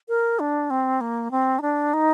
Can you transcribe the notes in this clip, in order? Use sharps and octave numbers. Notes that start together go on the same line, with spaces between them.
A#4
D4
C4
A#3
C4
D#4
D4
D#4